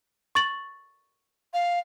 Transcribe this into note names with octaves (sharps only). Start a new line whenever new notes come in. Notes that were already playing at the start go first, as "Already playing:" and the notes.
C#6 A6 F#7
F5